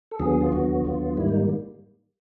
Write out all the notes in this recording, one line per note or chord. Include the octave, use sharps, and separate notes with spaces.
A4
D#2 D3 F#3 B3 G#4
F4
D#2 D3 F#3 B3 F#4
D#2 D3 F#3 B3 F4
G#2 D#3 G3 A#3 E4
D#4